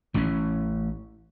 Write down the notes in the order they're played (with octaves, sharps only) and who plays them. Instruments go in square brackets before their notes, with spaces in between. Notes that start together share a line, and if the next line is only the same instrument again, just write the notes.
[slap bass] A1 E3 B3 C#4